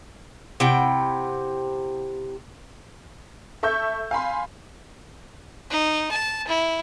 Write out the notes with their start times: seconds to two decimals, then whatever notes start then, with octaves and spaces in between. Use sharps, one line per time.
0.60 C3 E4 F#5 G5
3.63 A4 E5 C#6 E6 G6
4.11 F5 G#5 B5 C6
5.70 D#4
6.11 A5
6.47 E4